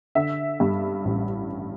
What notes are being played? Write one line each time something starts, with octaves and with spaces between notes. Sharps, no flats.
D3 E5
G2
A1